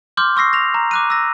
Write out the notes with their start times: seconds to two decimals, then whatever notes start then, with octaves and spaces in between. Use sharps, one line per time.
0.17 C6 D6 F6 G6
0.36 C6 C#6 E6 A#6 C7
0.53 A#6 F7
0.74 A#5
0.91 D6 F#6 D#7
1.10 E6 A#6